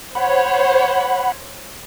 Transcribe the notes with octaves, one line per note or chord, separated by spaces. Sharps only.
C5 C#5 F#5 B5